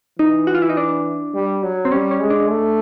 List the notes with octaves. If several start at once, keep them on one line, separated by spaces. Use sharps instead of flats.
E3 D#4
F#4
F4
E4
D#4
D4
G3
F#3
C4
G3 C#4
C#4
G#3
D4
A3